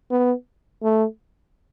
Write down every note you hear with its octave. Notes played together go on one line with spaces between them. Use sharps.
B3
A3